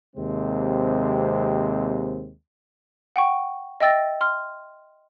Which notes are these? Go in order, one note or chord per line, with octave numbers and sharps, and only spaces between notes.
D#2 C3 G#3 C4
F#5 G5 C#6
D#5 E5 G5 E6 A6 A#6
C6 F6